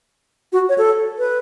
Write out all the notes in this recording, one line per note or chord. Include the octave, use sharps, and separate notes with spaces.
F#4
C#5
A4
B4